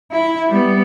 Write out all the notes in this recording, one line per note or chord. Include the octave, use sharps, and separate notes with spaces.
E4
G3 B3